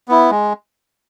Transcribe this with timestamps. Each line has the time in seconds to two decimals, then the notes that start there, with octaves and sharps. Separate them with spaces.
0.08 B3 E4
0.31 G#3